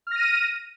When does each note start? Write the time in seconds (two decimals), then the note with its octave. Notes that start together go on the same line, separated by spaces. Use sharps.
0.07 F6
0.11 A#6
0.16 D#7